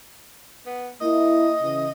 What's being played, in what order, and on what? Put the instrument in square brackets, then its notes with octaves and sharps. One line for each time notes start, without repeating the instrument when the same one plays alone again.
[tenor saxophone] B3
[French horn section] A#3 E4 [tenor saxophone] D#5
[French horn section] C#3 E3